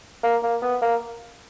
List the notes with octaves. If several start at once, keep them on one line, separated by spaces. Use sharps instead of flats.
A#3
A#3
B3
A#3